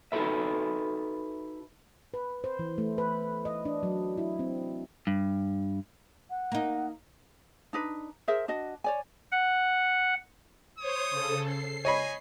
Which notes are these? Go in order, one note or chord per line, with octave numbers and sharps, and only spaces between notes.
D#4 F#4 G4 A4 B4 E5
B4
C5
E3
A3
B4
D#5
D4
F#3
E4
C4
G2
F#5
A#3 D#4
D4 D#4 B4
G#4 A#4 C5 E5
D4 F#4 D#5
C#5 D5 G#5
F#5
C5 C#5 D#6
C#3 A4
C7
C#5 D#5 G#5 B5